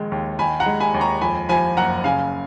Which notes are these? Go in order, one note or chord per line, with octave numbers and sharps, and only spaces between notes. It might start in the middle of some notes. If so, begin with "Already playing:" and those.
Already playing: A#1 D#3 G#3
D#2
D#3 G#5 B5
F#5 A#5
G#3
G#5 B5
D#2
A#5 C#6
F2 G#5 B5
F3 G#5 B5
F#1 F#5 A#5
C#3 F5 G#5